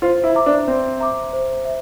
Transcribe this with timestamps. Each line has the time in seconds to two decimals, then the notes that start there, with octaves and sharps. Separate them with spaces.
0.02 F4 C5
0.24 E4
0.35 E5 A#5 D6
0.46 D4
0.67 C4 C5
1.00 E5 A#5 D6
1.33 C5
1.65 E5